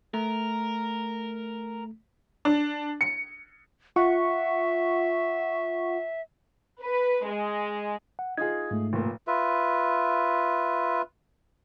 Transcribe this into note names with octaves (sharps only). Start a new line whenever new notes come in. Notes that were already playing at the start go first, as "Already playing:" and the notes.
A3 A#4
D4
C#7
F4 E5 F#5 C#6
B4
G#3
F#5
D#4 F4 G#4 G#6
G#2 A3
F1 A#2
F4 B4 E5